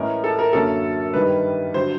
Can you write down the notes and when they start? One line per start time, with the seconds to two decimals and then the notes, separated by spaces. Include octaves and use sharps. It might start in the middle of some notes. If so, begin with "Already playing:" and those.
Already playing: A2 E3 G#3 C#4 A#4
0.24 A4
0.39 A#4
0.53 F#2 D3 F#3 A#3 C#4 A4
1.14 G2 D#3 G3 B4
1.74 D3 F#3 C5